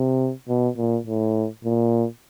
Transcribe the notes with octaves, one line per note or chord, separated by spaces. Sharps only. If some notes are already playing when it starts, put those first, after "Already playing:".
Already playing: C3
B2
A#2
A2
A#2